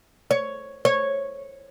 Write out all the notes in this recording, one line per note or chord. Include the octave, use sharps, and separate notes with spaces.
C#5
C#5